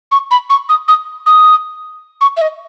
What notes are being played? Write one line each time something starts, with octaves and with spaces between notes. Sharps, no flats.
C#6
B5
C#6
D#6
D#6
D#6
C#6
E5
D#5